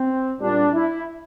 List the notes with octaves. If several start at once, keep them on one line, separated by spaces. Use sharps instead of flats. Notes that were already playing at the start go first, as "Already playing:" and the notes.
Already playing: C4
A#2 G3 D4
E4